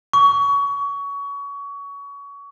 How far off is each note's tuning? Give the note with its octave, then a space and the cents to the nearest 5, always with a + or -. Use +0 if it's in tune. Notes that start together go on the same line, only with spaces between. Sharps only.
C#6 +25